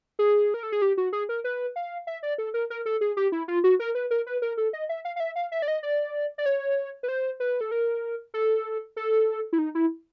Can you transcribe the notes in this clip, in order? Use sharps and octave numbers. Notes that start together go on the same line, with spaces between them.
G#4
A#4
A4
G#4
G4
F#4
G#4
A#4
B4
F5
E5
D5
A4
A#4
A#4
A4
G#4
G4
E4
F4
F#4
A#4
B4
A#4
B4
A#4
A4
D#5
E5
F5
F5
E5
F5
E5
D5
D#5
D5
D5
C#5
B4
C5
B4
A4
A#4
A4
A4
E4
D#4
E4